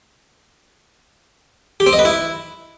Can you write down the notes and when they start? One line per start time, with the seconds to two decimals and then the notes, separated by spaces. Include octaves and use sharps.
1.80 G4
1.86 C4
1.93 D#5
1.99 B4
2.05 E4